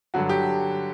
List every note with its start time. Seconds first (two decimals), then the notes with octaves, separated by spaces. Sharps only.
0.14 G2 D3 F#3 F#4
0.29 G4